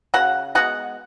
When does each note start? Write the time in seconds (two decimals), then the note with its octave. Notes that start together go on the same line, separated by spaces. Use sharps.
0.14 C#3 F#4 F#5
0.55 G#3 B3 F#4 F#5